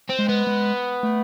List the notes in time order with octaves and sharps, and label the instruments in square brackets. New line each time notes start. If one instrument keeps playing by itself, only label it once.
[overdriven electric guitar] C4
[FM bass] G#3
[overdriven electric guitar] B3
[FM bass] G#3
A3